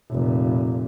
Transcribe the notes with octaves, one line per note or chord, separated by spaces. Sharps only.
F1 A#2